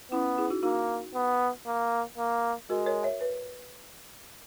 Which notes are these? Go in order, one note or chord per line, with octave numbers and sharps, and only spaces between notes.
B3 C#4 E4
E4 G#4
D#4 F#4
A#3 D#4 F#4
B3
A#3
A#3
G#3 F#4 A#4
A#4 C#5
C#5 E5
B4